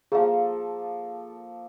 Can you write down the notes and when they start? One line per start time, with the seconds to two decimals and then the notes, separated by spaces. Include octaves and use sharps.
0.12 F3 A#3 G#4 A4 F5